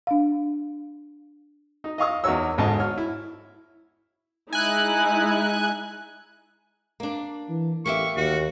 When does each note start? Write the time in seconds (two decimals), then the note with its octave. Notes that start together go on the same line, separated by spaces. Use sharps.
0.07 D4 F5
1.84 D#4
1.98 D#5 F5 C#6 D#6
2.24 E2 D#4 F#4 A#4 C#5 E6
2.58 G#1 G#2 D3 D#5 A5
2.80 C#5 F6
2.98 E4
4.53 G#3 D#4 E4 G#5 F#6
7.00 A#3 D4
7.49 E3
7.85 A1 A#3 G4 E5 C#6
8.16 D#2 F#4